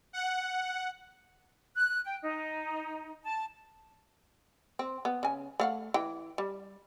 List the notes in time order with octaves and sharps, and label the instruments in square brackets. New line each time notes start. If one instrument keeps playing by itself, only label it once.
[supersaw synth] F#5
[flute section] F#6
G5
D#4
A5
[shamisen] C4
B3
C#3 G#5
A3 F5 F#5
E3 G5
G3